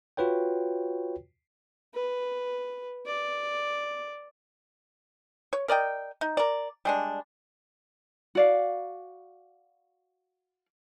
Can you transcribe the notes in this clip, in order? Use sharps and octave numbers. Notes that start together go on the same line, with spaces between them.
F4 F#4 B4 C#5 G5
B4
D5
C#5
A#4 D5 D#5 G5
D#4
A#4 D5
G3 G#3 D4
F#4 D5 F5